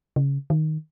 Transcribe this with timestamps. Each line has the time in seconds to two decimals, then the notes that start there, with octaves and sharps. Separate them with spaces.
0.16 C#3
0.50 D#3